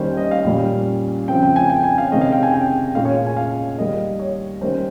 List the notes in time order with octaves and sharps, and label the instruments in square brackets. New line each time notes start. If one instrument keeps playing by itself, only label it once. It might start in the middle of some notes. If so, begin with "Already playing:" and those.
Already playing: [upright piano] D#3 G3 A#3 C#4 C5
D#5
F5
A#2 G3 C#4
C#3 F3 C4 G5
G5
G#5
G5
G#5
F5
C3 D#3 G#3 C#4 D#5
F5
G5
G#5
G5
A#2 G#3 C#4 F5
C#5
F5
G#5
F5
D#3 G3 A#3 D#5
C#5
D#3 G3 A#3 C#4 C5